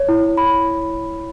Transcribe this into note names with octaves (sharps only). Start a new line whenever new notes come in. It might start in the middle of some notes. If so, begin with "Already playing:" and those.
Already playing: C#5
E4
B5